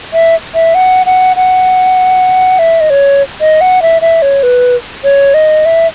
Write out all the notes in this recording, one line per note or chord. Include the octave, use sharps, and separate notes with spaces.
E5
E5
F#5
F#5
F#5
E5
D#5
C#5
D#5
F#5
E5
E5
C#5
B4
C#5
D#5
E5